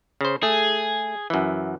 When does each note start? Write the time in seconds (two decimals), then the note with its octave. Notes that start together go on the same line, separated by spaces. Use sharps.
0.21 C#3 C5
0.43 A3 G#4
1.30 F#2 E3